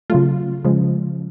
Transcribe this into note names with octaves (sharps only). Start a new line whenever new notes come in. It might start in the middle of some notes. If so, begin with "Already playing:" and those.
C#3 F#3 A3 F4
C#3 F3 G#3